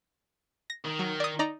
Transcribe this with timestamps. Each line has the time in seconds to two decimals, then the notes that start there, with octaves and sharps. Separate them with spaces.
0.70 A#6
0.84 D#3
0.99 F#3
1.20 D5 D#6
1.39 D#4 D5 A#5